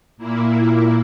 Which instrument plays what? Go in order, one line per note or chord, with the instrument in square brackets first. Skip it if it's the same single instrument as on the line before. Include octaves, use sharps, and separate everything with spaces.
[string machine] A#2 A#3 E4